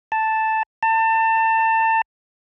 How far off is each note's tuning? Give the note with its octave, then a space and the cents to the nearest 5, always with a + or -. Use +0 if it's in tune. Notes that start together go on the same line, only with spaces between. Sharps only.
A5 +0
A5 +30